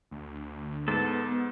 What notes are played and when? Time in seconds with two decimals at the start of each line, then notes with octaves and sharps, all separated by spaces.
0.11 D2
0.88 G#2 B3 A4 A5